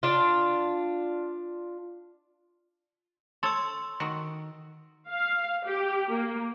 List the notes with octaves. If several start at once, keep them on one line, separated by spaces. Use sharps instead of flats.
D4 F4
A4 C#5 C6 E6
D#3 F#4
F5
G4
A#3